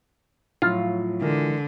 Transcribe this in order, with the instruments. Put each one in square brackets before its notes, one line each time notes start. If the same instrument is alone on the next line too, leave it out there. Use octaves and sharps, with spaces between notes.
[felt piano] A2 F3 F#3 [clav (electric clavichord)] F4
[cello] D3 [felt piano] E3 G#3 A#4